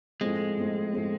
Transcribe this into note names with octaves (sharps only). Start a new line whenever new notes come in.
A2 F3 G#3 A3 C4
A2 F3 A3 C4
A2 F3 A3 C4